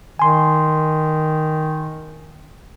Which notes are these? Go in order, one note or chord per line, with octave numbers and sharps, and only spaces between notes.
D#3 G#5 C6